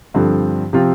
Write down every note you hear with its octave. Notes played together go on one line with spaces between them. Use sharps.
G2 D3 F3 C4
C3 F3 C4 F4